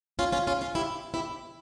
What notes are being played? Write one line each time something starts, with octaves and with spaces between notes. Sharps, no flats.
C#4 F4
C#4 F4
C#4 F4
C#4 F4
E4 G4
E4 G4